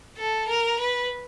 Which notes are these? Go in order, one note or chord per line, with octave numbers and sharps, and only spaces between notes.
A4
A#4
B4